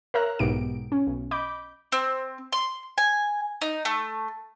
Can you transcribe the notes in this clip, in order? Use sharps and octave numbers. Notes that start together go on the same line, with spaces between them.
A#4 C#5 E5 A#5 F#6
B1 G#2 B2 D#4 G4 D7
C#4
B1
D#5 B5 D6 G6
C4
C6
G#5
D#4
A3